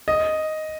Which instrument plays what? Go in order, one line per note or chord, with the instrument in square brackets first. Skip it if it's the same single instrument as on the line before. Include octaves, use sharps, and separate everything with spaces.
[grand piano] D#5